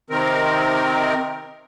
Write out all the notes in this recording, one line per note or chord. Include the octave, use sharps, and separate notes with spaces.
C3 D#3 C4 A#4